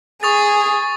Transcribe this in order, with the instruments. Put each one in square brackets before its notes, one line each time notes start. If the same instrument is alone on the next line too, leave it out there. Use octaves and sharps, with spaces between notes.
[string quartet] G#4 [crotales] C#6 D#6 A6